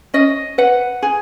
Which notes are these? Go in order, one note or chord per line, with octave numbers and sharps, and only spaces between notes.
C#4 D#5
B4 F#5
G#4